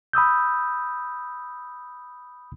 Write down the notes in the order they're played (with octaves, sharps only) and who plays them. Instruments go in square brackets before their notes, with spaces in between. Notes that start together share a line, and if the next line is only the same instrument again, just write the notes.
[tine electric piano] B5 D#6 E6 G6